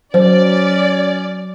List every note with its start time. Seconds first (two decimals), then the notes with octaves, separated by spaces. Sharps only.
0.14 F#3 C#4 C5 D5